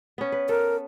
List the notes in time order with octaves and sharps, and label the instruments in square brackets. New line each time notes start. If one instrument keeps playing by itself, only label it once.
[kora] B3 C#4
B4
[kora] A4 [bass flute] A#4